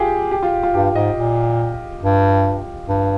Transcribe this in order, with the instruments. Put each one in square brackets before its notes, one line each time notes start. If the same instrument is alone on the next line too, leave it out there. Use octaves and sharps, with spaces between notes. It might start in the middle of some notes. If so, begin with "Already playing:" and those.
Already playing: [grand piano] F4 G4 G#4
G4
F4
F4
[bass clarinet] G2 [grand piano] G4
[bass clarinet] G#2 [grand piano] D#5
[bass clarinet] A#2
G2
G2